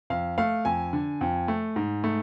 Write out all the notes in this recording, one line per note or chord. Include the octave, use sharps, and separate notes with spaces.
F2 F5
A3 F5
F2 G#5
D3
F2
A3
G#2
A3